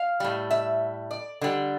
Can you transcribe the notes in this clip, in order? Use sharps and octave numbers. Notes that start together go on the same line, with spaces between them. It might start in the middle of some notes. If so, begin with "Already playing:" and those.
Already playing: F5
A2 G3
E5
D5
D3 G3